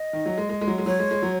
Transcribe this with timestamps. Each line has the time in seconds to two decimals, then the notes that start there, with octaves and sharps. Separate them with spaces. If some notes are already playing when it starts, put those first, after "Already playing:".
Already playing: D#5
0.13 D#3
0.26 F#3
0.38 G#3
0.49 G#3
0.61 G#3
0.67 F#3
0.78 G#3
0.86 F#3 C#5
0.99 G#3
1.11 G#3
1.23 F#3